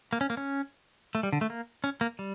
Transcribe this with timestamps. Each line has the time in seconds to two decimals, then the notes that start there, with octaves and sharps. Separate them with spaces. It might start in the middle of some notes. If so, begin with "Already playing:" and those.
0.13 A#3
0.21 C#4
0.30 A#3
0.37 C#4
1.15 A3
1.23 G3
1.32 D3
1.41 A3
1.50 A#3
1.84 C#4
2.01 A#3
2.19 G3